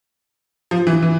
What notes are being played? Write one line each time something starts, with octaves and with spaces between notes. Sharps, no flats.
F3
E3
E3